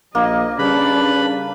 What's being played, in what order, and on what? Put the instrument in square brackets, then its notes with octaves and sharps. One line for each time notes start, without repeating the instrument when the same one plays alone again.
[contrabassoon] A#1 [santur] A#3 [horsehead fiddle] D#5
[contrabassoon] C#3 [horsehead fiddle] G3 D4 [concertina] B4 B5